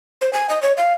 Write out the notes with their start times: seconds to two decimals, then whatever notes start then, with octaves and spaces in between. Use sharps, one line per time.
0.21 C5
0.33 G#5
0.49 D#5
0.63 C#5
0.77 F5